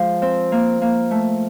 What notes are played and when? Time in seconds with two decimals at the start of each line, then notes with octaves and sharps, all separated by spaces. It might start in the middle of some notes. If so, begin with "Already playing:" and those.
Already playing: F3 G#3
0.22 C4
0.52 A#3
0.82 A#3
1.11 A3